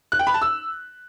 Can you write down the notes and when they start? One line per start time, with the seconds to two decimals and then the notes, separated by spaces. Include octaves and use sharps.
0.12 F#6
0.19 G5
0.27 B5
0.34 A5
0.42 E6